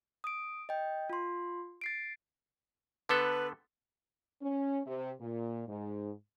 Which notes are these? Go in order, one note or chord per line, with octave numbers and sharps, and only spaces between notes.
D#6 D7
D#5 G5
F4 C6
A6 C7 D7
D3 B3 A4 B4
C#4
C3
A#2
G#2